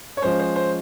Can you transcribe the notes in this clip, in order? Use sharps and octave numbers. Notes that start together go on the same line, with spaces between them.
C#5
F3 G#3 C#4 C5
C5
C5